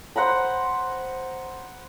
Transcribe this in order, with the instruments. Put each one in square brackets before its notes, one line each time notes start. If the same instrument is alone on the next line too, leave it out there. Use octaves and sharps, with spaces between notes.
[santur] C5 F#5 A#5 B5